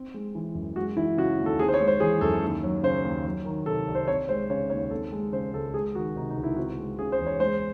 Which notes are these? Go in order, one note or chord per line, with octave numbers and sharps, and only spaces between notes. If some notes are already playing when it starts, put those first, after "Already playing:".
Already playing: C4
G#3
E3
F#2
G#3 F#4
E3 E4
C#3 F#4
D#2
A4
C4 G#4
C5
C#5
G#3
C5
E3 G#4
F#2 A4
D#2
F#3
C#3 C5
D#2
F#3
D#3
C3 A4
C2
C5
C4 C#5
G#3 C5
C#3 C#5
D#2 C#5
C4 A4
G#3
C#3 C5
C#2 A4
G#3 G#4
D#3 F#4
C3 D#4
D#4
C#2
E4
C4 F#4
G#3
C#3 G#4
C5
E2
C#5
G#3 C5